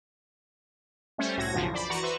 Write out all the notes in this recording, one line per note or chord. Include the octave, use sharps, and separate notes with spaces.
G3 A3 C#4 C5 C#5
C2 A2 F#4 G#6 A#6
B1 F#2 A2 D3 E3 F3
C5 D5 B5
E3 F#4 F#5 A#5 C#6 A6
F#4 B4 C5 E5 C#6